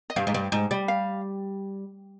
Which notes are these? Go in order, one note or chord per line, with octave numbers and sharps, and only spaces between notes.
D#5
G2 F5
G#2
G2
G#2
G3
F5